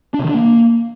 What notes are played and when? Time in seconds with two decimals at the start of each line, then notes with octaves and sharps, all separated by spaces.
0.14 D4
0.19 C3
0.24 D#3
0.29 D4
0.34 A#3